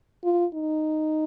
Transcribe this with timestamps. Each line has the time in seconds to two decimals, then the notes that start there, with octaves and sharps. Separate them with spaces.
0.24 F4
0.54 D#4